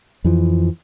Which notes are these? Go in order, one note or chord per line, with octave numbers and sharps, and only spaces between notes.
F2 E3 F3